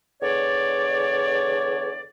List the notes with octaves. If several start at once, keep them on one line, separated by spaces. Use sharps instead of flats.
E2 D3 C#5 D5